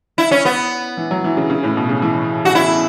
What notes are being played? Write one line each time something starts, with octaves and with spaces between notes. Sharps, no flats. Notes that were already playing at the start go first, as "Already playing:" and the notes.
E4
C#4
B3
E3
F#3
E3
C#3
C#3
A2
B2
C#3
E3
F#4
E4